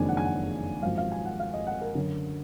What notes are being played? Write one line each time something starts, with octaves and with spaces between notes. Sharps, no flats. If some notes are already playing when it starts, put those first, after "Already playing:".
Already playing: F#1 F2 D#3 G#3 D4 G#5
F#5
G#5
F#5
G#1 F#2 F3 F5
F5
G#5
F#5
F5
D#5
F#5
A#4
F#2 D3 F#3